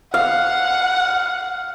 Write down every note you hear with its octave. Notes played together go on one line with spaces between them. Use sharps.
F5 F#5